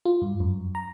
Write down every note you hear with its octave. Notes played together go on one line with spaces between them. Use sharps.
F4
G2
F#2
A#5